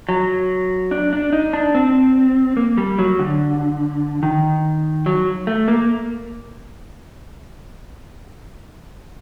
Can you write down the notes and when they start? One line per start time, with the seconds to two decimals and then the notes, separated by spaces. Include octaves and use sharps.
0.09 F#3
0.91 D4
1.13 D4
1.33 D#4
1.53 D4
1.75 C4
2.57 A#3
2.78 G3
2.99 F#3
3.19 D3
4.23 D#3
5.06 F#3
5.47 A3
5.68 A#3